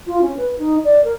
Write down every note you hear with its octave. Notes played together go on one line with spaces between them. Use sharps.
F4
C#4
B4
D#4
D5
A#4